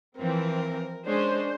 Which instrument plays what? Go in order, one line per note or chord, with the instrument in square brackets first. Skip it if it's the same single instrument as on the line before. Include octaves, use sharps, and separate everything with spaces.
[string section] E3 F3 C4 [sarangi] A#4
[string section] G#3 C#4 [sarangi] D4 [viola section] C5